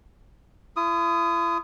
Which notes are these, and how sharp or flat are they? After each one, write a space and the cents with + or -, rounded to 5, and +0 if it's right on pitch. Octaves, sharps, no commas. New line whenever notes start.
E4 +45 D#6 +0